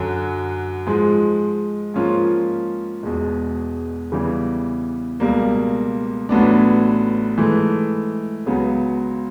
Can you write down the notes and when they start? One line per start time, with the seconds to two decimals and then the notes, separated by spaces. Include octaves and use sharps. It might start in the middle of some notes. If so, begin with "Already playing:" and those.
Already playing: F#2 D3 F#3
0.87 G#2 F3 G#3
1.94 G#2 F3 A#3 C#4 F4
3.03 E1 E2 B2 G#3
4.12 E2 C#3 E3 G3
5.20 C#2 B2 G3 A#3
6.29 A1 A2 F#3 B3 D4
7.38 G#2 E3 A3
8.46 C#2 C#3 F#3 B3